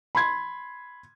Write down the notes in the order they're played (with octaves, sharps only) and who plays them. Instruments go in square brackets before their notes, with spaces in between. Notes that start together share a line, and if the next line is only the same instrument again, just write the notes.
[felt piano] B5 C6 G#6